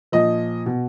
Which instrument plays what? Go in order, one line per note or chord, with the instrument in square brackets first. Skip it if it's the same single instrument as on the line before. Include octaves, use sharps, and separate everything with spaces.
[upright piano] A#2 F3 D#5
B2